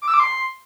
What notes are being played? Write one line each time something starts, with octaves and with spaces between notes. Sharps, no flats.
D6
E6
D6
C6